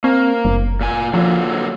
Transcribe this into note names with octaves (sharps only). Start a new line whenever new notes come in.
A#3 C4
F#1
A#2 G#5
D3 F3 F#3 A#3